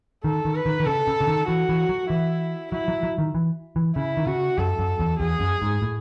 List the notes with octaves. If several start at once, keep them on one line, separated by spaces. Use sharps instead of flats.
D#3 A4
D#3
B4
D#3
D#3
C#3 A4
C#3
C#3
D#3
E3 F#4
E3
F#3
E3 E4
F#3 E4
F#3
F#3
D#3
E3
E3
C#3 E4
D#3
C#3 F#4
F#2 A4
F#2
E2
E2 G#4
F#2
G#2
A2